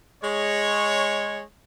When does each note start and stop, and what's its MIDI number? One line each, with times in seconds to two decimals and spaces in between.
0.23 1.41 56
0.23 1.41 73